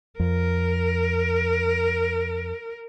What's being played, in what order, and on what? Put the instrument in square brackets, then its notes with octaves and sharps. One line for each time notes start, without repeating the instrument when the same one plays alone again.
[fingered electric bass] F2 [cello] A#4